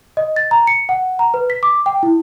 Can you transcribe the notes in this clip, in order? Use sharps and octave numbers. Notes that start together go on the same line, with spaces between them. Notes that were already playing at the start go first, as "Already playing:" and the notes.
D#5
A6
A#5
C#7
F#5
A#5
B4
B6
D6
G5
E4